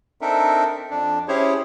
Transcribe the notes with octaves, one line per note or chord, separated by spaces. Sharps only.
C4 D4 D#4 A4 A#4 E5
F2 D4
C#4 E4 G4 G#4 C5 C#5